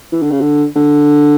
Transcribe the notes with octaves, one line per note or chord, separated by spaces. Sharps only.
E3
D3
C#3
D3
D3